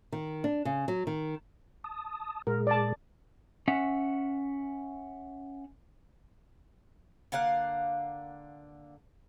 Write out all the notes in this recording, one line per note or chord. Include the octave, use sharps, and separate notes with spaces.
D#3
D4
C#3
F#3
D#3
A5 D#6
A#2 G#3 G#4 A#4
D5 A5
C#4 E5 F#5
D3 A#3 F5 F#5